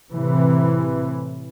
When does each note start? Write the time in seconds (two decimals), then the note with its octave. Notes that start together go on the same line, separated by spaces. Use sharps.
0.12 A2 C3 E3